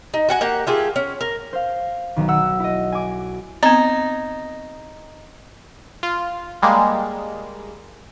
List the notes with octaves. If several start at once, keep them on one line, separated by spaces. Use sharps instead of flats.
D#4
F#4 F#5 G#5
A#3 G4 F#5
A3 F4 G4 G#4
C#4
A#4
C5 F5
B1 D#3
F#5 E6
E4 D#5
G#5 D6
B3 C4 D#4
F4
G3 G#3 A#3